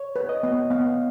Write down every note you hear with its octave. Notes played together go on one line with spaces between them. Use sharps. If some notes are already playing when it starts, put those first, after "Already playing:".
Already playing: C#5
B4
D#5
B3
B3 F5